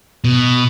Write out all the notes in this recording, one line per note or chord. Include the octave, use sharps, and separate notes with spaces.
B2